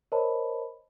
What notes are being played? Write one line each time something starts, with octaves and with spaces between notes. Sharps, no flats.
A#4 C5 C#5 D#5 A5 B5